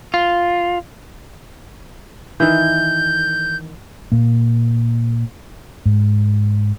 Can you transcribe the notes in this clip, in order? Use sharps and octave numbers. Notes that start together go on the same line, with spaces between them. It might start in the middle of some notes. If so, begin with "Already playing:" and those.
F4
D#3 E3 G6
A#2 A#3
G#2